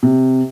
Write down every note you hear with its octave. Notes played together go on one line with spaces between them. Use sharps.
C3